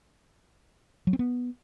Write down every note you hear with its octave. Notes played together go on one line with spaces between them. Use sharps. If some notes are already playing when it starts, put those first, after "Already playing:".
F#3
C4
B3